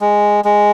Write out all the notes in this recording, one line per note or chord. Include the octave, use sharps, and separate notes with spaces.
G#3
G#3